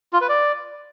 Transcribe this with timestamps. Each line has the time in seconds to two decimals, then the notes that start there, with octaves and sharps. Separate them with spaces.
0.13 F4
0.21 B4
0.29 D5